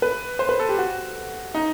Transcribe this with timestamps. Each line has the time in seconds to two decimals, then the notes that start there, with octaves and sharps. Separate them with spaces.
0.02 B4
0.39 C5
0.49 B4
0.59 A4
0.69 G4
0.78 F#4
1.54 D#4